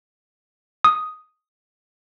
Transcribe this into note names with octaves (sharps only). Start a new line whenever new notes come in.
D#6